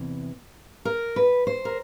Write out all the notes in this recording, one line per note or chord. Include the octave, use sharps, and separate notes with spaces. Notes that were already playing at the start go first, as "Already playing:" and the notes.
Already playing: E2 C3 E3
A#4
B4
C5
A#4